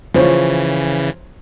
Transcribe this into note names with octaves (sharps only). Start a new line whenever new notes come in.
C#3 E3 F3 C5 C#5